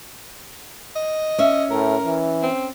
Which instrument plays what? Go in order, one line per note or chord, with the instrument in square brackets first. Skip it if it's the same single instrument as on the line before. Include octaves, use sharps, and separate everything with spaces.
[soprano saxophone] D#5
[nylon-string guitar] C#4 E5
[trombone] A2 [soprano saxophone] A#4
[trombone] E3
[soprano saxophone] C4